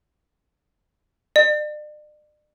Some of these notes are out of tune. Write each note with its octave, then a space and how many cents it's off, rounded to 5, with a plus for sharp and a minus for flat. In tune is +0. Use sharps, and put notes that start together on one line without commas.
D5 +40